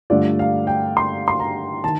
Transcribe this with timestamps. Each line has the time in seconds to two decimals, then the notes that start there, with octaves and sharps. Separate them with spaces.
0.10 G2 D3 A3 D4 F4 D5
0.39 F5
0.67 G5
0.97 C6
1.28 C6
1.40 A#5
1.84 D#3 A5